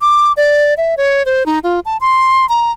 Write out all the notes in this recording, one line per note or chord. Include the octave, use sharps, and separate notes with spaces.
D6
D5
E5
C#5
C5
D#4
F4
A5
C6
A#5